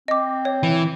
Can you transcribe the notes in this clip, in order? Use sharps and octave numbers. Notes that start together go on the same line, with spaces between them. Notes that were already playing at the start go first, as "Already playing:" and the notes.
C4 D#5 D6
C#5
E3